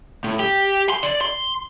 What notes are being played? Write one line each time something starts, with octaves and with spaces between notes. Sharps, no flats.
A2
G4
C6
D5
C6